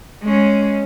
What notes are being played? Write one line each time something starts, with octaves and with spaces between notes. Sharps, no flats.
G#3 C#4